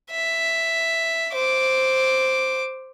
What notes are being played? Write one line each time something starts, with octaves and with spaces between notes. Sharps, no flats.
E5
C5 D6